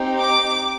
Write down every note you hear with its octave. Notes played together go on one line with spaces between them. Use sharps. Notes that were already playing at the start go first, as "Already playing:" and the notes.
Already playing: C4 D#4 G4
D6